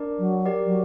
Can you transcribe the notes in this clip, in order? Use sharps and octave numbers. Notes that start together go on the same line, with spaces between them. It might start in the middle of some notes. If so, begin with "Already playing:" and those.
Already playing: D4 A#4 D5
F#3
G4 A#4 D5
F#3